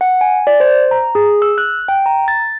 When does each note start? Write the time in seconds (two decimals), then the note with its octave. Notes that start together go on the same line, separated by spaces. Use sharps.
0.01 F#5
0.21 G#5
0.47 D5
0.60 C5
0.91 A#5
1.15 G#4
1.42 E6
1.58 F#6
1.88 G5
2.06 A#5
2.28 A6